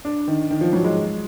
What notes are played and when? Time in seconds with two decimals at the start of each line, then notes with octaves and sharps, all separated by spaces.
0.05 D4
0.28 D#3
0.51 D#3
0.61 F3
0.73 F#3
0.84 G#3